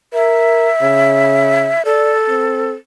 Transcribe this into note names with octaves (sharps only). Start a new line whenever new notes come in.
A#4 E5
C#3
A4 D5
C4